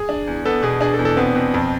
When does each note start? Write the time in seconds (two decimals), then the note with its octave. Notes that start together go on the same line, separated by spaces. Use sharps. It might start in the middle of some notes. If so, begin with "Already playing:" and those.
Already playing: G#4
0.09 D4
0.27 E2
0.45 B3 A4
0.62 B2 G#4
0.81 D4 G#4
0.94 A4
0.99 E2
1.05 A4
1.17 B3 C4
1.35 B2 C4
1.54 F2